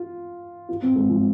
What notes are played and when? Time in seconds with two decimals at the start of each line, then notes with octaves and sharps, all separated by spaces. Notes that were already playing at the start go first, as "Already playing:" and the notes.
Already playing: F4
0.69 F4
0.82 C4
0.96 G#3
1.09 F3